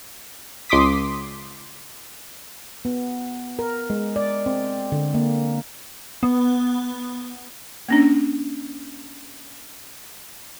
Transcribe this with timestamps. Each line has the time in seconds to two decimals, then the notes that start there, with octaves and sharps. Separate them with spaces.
0.69 C#2 C6 D6 D#6 B6
2.85 B3
3.59 A#4
3.90 G#3
4.16 D5
4.46 C4
4.92 D3
5.14 A#3
6.23 B3
7.89 A#3 C#4 D4